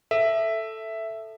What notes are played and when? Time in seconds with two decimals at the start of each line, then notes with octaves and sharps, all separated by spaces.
0.11 A4 E5